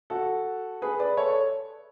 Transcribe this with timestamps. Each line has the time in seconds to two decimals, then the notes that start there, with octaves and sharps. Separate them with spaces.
0.10 F#4 A4
0.82 G#4 B4
1.00 B4 D5
1.17 A4 C#5